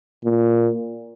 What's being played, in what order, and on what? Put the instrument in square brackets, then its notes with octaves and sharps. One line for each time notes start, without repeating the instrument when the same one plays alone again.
[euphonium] A#2